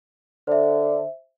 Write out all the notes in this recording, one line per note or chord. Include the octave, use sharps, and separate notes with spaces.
D3 C5 E5